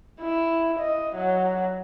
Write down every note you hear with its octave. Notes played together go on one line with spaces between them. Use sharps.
E4
D#5
F#3